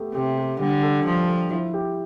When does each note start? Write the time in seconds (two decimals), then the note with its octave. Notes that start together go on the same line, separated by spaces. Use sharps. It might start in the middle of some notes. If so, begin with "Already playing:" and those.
Already playing: A3 B3 G4
0.14 C3 G4
0.38 G4
0.60 D3 G3
0.83 A4
1.05 F3 D4
1.27 A4
1.51 E4
1.74 G4